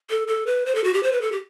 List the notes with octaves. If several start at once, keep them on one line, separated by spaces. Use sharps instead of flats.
A4
A4
B4
C5
A4
F#4
G4
C5
B4
A4
G4